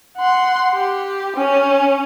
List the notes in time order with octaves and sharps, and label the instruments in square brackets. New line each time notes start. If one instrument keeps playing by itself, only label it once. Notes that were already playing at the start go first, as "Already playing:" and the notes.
[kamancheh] F#5 C6
G4
C#4